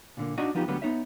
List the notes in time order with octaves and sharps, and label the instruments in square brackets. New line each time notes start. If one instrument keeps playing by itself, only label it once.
[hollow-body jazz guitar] A#2 D3 A#3
D4 D#4 F#4 D5 D#5
F3 B3 D#4 F4 G4
D2 D3 F#3 G3 B3
B3 D#4 C#5 E5